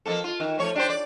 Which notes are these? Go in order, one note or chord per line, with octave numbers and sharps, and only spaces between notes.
F2 A#3 A4
F4
D#3
F3 A3 C#5
D4 G4 C5
D5